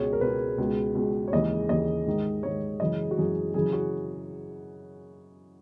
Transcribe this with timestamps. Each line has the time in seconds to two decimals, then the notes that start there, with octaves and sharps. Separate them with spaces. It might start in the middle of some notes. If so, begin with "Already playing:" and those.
Already playing: C#2 B2 G#3 C#5
0.13 A#4
0.21 C#2 B2 G#3 B4
0.58 C#2 B2 G#3
0.95 C#2 B2 G#3
1.28 C#5
1.32 D#2 C#3 E3 G#3 D#5
1.69 D#2 C#3 E3 G#3 D#5
2.06 G#2 D#3 G#3
2.43 G#2 D#3 G#3 C#5
2.80 F#2 C#3 E3 G#3 D#5
3.11 F#4
3.17 F#2 C#3 E3 G#3 G#4
3.54 F#2 C#3 E3 G#4
3.73 F#4